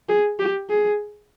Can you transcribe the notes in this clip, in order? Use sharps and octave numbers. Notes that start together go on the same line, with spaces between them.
G#4
G4
G#4